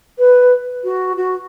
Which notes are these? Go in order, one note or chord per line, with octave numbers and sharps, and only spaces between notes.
B4
F#4
F#4